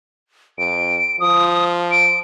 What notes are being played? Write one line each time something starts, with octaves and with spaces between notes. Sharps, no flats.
F2 D7
F3 D#6
D7